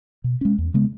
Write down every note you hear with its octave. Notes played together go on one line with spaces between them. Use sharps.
B2
G#3 C#4
E2
C#3 G#3 B3